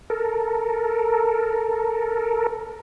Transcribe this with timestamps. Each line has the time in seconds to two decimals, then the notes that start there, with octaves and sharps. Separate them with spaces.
0.10 A4 A#4